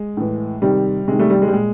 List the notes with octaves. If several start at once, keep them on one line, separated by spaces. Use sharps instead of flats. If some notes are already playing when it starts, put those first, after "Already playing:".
Already playing: G#3
A2 E3
C3 D#3 G3
C3 D#3 G#3
G3 A3
G3
G#3
G3
A#2 G#3